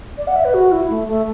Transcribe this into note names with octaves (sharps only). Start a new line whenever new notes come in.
D5
F#5
E5
B4
F#4
E4
A3
A3